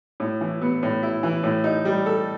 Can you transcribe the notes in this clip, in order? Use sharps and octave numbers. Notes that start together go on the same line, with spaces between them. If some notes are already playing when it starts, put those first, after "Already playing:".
A2
E3
B3
A2
E4
E3
A2
D#4
G3
A4